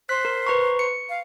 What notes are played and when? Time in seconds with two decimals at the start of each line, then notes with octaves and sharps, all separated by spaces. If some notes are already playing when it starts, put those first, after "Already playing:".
0.09 C5 F#6 B6
0.25 A#4
0.47 B4 A#5 C#6
0.79 C#7
1.09 F5